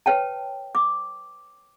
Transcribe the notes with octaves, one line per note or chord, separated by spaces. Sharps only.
B4 C#5 G5 A5
D6